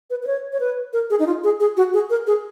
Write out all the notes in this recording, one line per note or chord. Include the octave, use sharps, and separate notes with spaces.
B4
B4
C#5
C#5
B4
A#4
G#4
D#4
F4
G#4
G#4
F#4
G#4
A#4
G#4